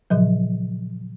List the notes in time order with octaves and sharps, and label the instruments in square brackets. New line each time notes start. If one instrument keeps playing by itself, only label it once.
[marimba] A#2 C#3 F3 F#3